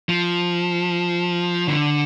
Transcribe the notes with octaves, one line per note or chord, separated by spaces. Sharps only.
F3
D3